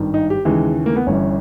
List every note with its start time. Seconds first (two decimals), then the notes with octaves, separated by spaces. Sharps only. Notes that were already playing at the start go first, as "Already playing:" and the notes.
Already playing: G#1 G2 D#3
0.14 D#4
0.30 G4
0.45 D#2 C#3 E3 G#3
0.86 A#3
0.96 B3
1.06 G1 G2 E3 C#4